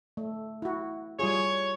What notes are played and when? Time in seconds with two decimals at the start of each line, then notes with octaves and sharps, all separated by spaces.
0.17 A3
0.62 E4 F#4
1.19 G3 F4 G#4 C#5